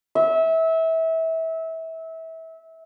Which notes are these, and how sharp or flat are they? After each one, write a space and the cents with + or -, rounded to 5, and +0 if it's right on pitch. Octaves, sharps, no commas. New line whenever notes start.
E5 -25